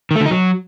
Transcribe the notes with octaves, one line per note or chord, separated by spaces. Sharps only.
D#3
A3
D3
D#4
F#3